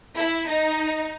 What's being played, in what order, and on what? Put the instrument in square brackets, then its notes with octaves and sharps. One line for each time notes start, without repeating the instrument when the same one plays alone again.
[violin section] E4
D#4